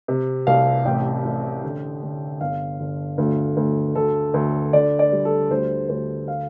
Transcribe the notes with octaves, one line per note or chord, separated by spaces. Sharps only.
C3
C2 F5
A1 G5
A1
D3
D3
G1 F5
G1
D2
D2
D2 A4
D2
D3 D5
D5
G3
A4
D2 C5
D2 C5
F5